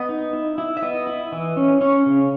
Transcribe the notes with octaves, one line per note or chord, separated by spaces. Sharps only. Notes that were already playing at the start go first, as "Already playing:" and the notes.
Already playing: B3 D#5
D#4
E4
E4
E5
B3 D#5
E4
E3
C#4
C#4 C#5
C#3